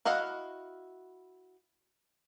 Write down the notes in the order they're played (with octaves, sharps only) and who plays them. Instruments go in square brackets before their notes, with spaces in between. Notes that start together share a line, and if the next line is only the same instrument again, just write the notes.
[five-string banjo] E4 F#4 D#5 F5 F#5